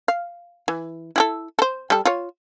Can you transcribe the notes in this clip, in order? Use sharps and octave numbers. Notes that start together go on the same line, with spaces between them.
F5
E3
E4 G#4 A4
A4 C5
G3 A4
F4 C#5